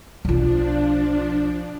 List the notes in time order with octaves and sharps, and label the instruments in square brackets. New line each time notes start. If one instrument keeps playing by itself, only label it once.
[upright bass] B1 F4 [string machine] F3 D4